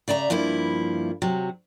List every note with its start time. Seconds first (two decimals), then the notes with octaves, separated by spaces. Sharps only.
0.08 C#3 D5 E5 A#5
0.30 G2 F3 A#3 E4
1.22 C3 F#3